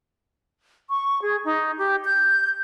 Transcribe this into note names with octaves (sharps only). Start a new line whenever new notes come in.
C#6
G#4
D#4
G4
G6